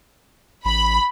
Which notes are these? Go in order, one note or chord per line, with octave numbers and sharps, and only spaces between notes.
A1 B5